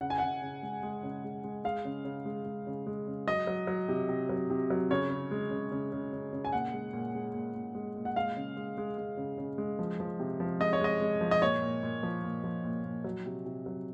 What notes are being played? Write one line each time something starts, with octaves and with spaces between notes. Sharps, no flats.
C#3 F#5
G#5
C#3 F#5
C#3
G#3
G#3
C#3
G#3
G#3
G#3 F5
C#3
C#3
G#3
G#3
C#3
G#3
C#3
F#3 D#5
F#3
F#3
C3
C3
F#3
C3
F#3
C#3 C#5
C#3
G#3
C#3
C#3
C#3
C#3
C#3
G#5
A#2 F#5
G#3
A#2
G#3
A#2
A#2
G#3
A#2
F#5
G#3 F5
C#3
G#3
G#3
G#3
C#3
C#3
G#3
F3
F3
C3
F3
G#3 D#5
C#5
G#3 D#5
G#3
F3
D#5
A#2 C#5
A#2
A#2
F3
A#2
F3
A#2
A#2
F#3
C3
C3
F#3